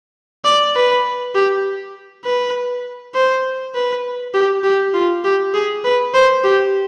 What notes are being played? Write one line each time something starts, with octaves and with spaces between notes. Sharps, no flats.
D5
B4
G4
B4
C5
B4
G4
G4
F4
G4
G#4
B4
C5
G4